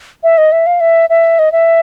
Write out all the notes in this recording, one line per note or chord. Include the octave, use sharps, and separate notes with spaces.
E5
D#5
E5
F5
E5
E5
D#5
E5